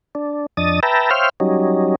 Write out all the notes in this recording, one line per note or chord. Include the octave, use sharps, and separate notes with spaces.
D4
F2 D4 D#5 D#6 A6
B4 E5 G5 A5 A#5
C5 C#5 E5 F5 G5 F6
F#3 G3 C#4 D#4